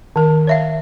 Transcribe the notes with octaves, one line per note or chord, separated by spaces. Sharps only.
D#3 A#4
C#5 E5 F5